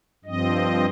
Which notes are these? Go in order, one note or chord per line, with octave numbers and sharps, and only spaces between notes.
G2 F3 C4 D#5